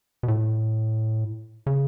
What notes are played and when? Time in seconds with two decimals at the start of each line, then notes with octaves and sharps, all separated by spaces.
0.23 B2
0.28 A2
1.66 C#3